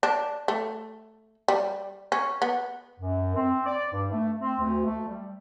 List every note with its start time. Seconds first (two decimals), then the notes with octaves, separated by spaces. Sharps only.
0.03 D4
0.48 A3
1.48 G3
2.12 C#4
2.42 B3
3.00 F#2
3.36 C4
3.66 D5
3.93 G2
4.12 A3
4.42 C4
4.61 D2
4.86 A3
5.07 G3